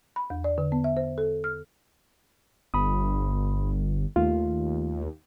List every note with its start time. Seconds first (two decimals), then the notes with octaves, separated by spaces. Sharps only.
0.16 B5
0.30 E2
0.44 D5
0.58 D3
0.72 B3
0.84 E5
0.97 C5
1.18 A4
1.44 F6
2.74 G1 B5 D#6
4.16 D#2 A3 F4